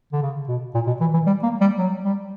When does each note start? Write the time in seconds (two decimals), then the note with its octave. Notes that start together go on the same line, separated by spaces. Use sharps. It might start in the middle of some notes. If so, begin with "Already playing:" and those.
0.13 D3
0.22 C#3
0.48 B2
0.74 A#2
0.87 B2
1.01 E3
1.14 E3
1.26 G3
1.43 A#3
1.61 G3
1.78 F#3
2.04 G3